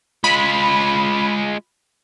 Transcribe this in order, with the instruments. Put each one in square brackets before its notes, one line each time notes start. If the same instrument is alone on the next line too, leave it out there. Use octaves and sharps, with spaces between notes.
[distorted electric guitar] G#3 F4 [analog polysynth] B5